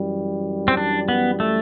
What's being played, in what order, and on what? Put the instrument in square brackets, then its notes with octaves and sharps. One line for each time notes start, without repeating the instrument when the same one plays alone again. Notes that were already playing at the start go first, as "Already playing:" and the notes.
Already playing: [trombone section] F#2 E3 G3
[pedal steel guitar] C4
D4
B3
A3